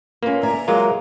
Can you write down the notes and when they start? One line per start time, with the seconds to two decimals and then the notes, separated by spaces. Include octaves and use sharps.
0.23 A#3 C#4 F4 B4
0.43 D5 E5 G#5 A#5
0.68 F#3 G#3 A#3 F4